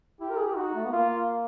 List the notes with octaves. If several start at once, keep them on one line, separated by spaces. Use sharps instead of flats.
E4 G4
A#4
G#4
G4
D#4 F#4
A3
B3
A#3 F4